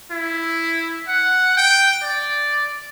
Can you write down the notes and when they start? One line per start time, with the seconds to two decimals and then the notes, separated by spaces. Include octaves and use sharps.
0.11 E4
1.07 F#5
1.57 G5
2.02 D5